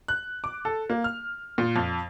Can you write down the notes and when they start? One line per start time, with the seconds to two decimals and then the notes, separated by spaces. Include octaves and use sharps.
0.08 F#6
0.44 D6
0.65 A4
0.90 A#3
1.04 F6
1.58 A#2
1.76 F2